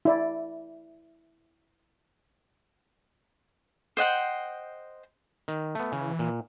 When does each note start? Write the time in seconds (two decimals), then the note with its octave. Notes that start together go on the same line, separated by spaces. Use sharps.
0.05 E4 D5
3.97 C5 D#5 F#5 G5
5.48 D#3
5.75 A3 B3
5.92 C#3 E3
6.19 A#2